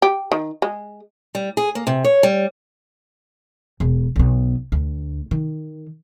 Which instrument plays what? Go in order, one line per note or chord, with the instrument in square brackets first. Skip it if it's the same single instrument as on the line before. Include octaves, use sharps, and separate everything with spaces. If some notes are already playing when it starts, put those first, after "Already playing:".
[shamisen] G4
D#3
G#3
[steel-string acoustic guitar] G3
G#4
A#3
C3
C#5
G3
[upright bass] E1
B1 B3
D2
D#3